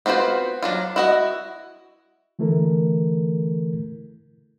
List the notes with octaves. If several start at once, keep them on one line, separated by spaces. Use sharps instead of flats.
B3 C4 F4 F#4 C5
F#3 D4 F4
E4 F#4 D#5
D3 E3 A3 E4 A4 A#4